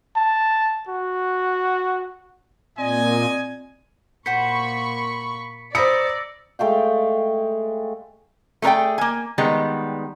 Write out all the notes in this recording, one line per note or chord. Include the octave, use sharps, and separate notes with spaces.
A5
F#4
A#2 C4 D5 D#5 G#5
A#2 F#4 C5 B5 C#6 B6 C#7
C5 D5 A#5 B5 D#6 E6 A#6 C#7
G#3 A3 F5 G5
A3 G#4 A#4 D5 G5
A#3 G#5
D#3 G3 G#3 B3